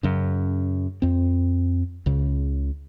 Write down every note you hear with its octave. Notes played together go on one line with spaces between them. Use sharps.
F#2 C#3
F2 C4
C#2 C#3